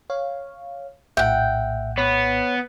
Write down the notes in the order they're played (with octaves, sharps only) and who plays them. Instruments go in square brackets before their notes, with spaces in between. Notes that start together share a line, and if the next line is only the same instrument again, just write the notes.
[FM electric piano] C#5 F5
[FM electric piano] A#1 A2 [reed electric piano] E5 [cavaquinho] F#5 G5
[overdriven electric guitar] B3 [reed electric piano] C#5 B5